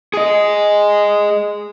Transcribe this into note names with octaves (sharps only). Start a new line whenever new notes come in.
G#4 D#5